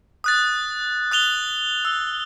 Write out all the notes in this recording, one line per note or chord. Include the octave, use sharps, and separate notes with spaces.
D#6 F#6 A6
D#6 F#6 F7 G7
E6